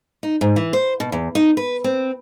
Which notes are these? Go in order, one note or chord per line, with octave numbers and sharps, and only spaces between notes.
D#4
G#2
E3
C5
B2
E2
D#4
B4
C4